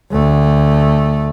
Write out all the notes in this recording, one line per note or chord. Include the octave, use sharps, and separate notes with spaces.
D2 A3